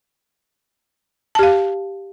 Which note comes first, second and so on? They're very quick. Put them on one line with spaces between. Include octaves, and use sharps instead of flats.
A5 G4 F5